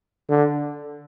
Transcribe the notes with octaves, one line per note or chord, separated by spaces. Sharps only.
D3